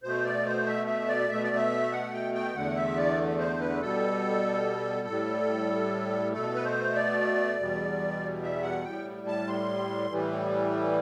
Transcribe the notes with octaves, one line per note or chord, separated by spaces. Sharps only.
B2 A3 C5
D5
C5
E5
E5
D5
B2 A3 E5
D5
E5
F#5
G5
G5
E2 D3 A3 F#5
E5
D5
C5
B4
B2 G3 A4
A2 G3
B2 A3 A4
B4
C5
D5
E2 B2 G3
E5
F#5
A2 G3 G5
A5
C6
A2 E3 G3